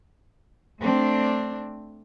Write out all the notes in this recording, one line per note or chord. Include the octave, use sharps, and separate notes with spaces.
A3 C4 D4